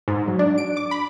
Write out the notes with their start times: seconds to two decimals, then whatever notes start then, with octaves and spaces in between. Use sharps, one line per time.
0.08 G#2
0.28 F#3
0.39 D4
0.58 D7
0.77 D6
0.91 B5